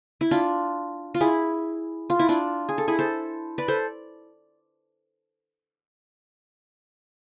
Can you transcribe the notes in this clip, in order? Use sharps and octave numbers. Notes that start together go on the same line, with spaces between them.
E4
D4 F4
F4
E4 G#4
F4
E4
D4 F4
G#4
A4
E4 G#4
A4 C5
B4 D5
A4 C5